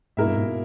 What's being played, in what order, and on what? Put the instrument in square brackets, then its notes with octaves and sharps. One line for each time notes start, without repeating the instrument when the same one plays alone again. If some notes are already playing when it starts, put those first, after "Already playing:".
[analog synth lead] G#2 [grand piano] B2 A#3 E4 A#4 E5
[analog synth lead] G2
G#2